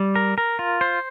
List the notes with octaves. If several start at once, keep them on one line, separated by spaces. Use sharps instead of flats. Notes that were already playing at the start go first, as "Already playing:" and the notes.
Already playing: G3
A#4
A#4
F4
C5